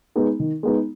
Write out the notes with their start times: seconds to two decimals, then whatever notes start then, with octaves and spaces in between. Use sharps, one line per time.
0.16 G#3 B3 D#4
0.40 D#3
0.63 G#3 B3 D#4